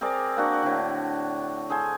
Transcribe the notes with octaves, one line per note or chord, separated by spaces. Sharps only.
C4 G#4 A#4 D5
A#3 D4 F#4 F#5
A2 D3
G#4 A4 C5 G#5